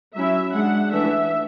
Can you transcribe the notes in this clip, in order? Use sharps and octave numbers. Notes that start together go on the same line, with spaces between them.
F#3 C#4 E4 E5
G#3 D4 F#5
E3 A3 D4 E5